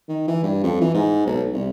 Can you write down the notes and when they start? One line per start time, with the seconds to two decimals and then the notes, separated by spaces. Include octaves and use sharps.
0.08 D#3
0.28 E3
0.43 G2
0.64 F2
0.81 E3
0.94 G#2
1.26 B1
1.53 C2